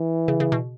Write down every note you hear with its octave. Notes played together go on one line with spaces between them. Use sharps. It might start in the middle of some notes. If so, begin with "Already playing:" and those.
Already playing: E3
C#3
C#3
B2